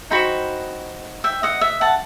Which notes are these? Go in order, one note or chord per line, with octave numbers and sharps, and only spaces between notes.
D#4 F#4 C5 G5 B5
E5 G5
D#5 F#5
E5
F#5 A5